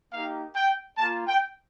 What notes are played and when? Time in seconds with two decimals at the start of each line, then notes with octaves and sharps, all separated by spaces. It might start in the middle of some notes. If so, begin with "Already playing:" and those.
0.12 A#3 D#4 G4 F5
0.55 G5
0.98 A#3 F4 A5
1.27 G5